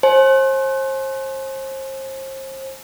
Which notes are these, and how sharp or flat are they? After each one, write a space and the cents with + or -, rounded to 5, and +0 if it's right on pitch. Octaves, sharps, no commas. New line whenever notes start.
C5 +35 G#5 +40